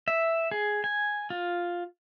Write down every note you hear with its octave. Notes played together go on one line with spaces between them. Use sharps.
E5
G#4
G#5
F4